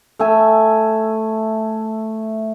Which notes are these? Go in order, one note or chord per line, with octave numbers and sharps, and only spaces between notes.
A3 E5 G#5